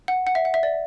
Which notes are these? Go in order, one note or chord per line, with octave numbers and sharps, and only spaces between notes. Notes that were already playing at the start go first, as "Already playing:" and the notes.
F#5
F#5
E5
F#5
E5
D5